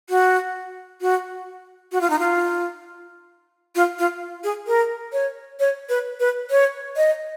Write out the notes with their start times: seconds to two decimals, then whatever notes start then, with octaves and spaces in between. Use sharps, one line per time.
0.10 F#4
1.01 F#4
1.92 F#4
2.01 F4
2.10 D#4
2.19 F4
3.75 F4
3.99 F4
4.44 G#4
4.67 A#4
5.13 C#5
5.60 C#5
5.89 B4
6.20 B4
6.51 C#5
6.97 D#5